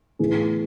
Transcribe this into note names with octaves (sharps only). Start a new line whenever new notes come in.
A2 E3 B3 E4 G#4